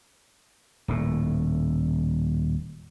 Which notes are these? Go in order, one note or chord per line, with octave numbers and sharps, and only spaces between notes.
D#1 A2